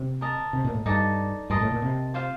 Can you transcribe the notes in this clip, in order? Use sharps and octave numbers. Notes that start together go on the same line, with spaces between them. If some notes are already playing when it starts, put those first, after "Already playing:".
Already playing: C3
A#4 D#5 A5
C3
A#2
A2
G2 D#4 A4 D5 A5
G2 A#4 D#5 A5 C6
A2
A#2
C3
F4 C5 F5